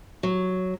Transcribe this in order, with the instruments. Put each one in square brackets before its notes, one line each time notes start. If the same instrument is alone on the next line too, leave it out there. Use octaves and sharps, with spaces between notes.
[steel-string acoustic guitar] F#3